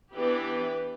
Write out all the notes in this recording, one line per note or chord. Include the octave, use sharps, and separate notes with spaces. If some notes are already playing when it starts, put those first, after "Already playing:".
E3 B3 D4 G4 B4